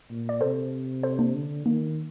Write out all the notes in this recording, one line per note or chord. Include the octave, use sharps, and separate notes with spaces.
A#2
D5
C3 A4 C5
A4 C5
A#3 D4
D3
D#3 A#3